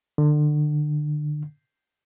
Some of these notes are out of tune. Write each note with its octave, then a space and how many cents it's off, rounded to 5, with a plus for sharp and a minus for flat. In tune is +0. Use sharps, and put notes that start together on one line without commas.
D3 +30